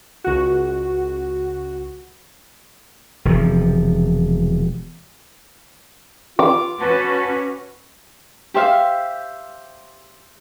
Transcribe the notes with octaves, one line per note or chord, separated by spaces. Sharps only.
C#2 F#4
E1 C3 F3
F4 D6
C#4 F#4 B4 A5
G4 C5 E5 F5